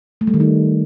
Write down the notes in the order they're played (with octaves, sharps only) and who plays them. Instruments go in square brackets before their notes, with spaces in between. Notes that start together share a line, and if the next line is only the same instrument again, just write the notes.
[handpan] A3
G3
D#3
D#4